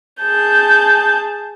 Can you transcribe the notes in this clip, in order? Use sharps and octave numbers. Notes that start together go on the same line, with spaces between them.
G#4 A5 G6